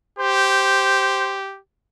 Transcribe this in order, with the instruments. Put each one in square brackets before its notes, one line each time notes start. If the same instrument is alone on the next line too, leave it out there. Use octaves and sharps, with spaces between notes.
[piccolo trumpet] G4 [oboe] C5